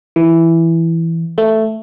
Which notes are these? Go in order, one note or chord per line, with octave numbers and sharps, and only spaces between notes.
E3
A3